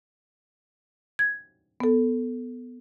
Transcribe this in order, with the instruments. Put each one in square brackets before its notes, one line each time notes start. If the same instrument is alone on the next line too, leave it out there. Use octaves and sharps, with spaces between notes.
[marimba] G#6
B3 A4